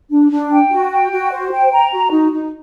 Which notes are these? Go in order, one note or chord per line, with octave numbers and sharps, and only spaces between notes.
D4
D4
G5
F#4
G5
F#4
C5
G5
A#5
F#4
D#4
D#4